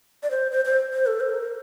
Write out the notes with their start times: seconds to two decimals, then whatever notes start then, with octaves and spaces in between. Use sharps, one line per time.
0.23 D5
0.31 C5
0.52 C5
0.65 C5
0.93 C5
1.06 A4
1.20 C5
1.29 A4
1.34 A#4